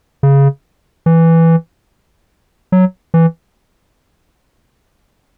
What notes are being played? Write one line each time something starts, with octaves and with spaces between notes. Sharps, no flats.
C#3
E3
F#3
E3